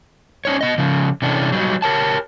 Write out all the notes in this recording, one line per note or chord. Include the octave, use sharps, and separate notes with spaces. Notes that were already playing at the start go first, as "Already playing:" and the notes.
C#4 D#4 C#5
B3 D#5
C#3 F3
C3 E3 C#4 D4
F#3 G3 D#4
G4 A#4 C#5 A5